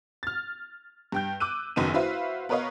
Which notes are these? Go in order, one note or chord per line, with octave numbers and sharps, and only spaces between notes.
F6 A6
G2 G5 G6
D6 E6 F#6 D#7
F#1 F#2 D#3 B3 D#4 D#7
E4 F#4 B4 C5 E5 F5
B3 A#4 B4 C#5 D#5 F5